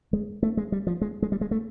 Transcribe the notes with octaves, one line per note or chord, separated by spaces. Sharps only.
G#3
A3
G#3
G3
F3
G#3
G#3
G3
G#3
A3